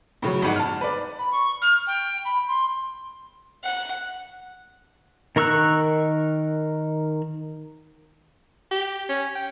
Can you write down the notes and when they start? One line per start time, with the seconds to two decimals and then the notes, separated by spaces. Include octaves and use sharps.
0.22 A2 C#3 F#3
0.42 G1 G#2 F#5
0.55 A5 F6
0.81 B4 D5
1.18 B5
1.32 C#6
1.61 F6
1.86 G5
2.25 B5
2.47 C6
3.64 F#5
5.36 D#3 A#4 C#6 E6 F#6
8.71 G4
9.09 C#4
9.35 G5